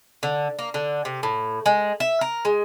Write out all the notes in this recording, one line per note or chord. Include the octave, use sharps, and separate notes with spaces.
D3
A#3
D3
C3
A2
G#3
E5
A#4
G#3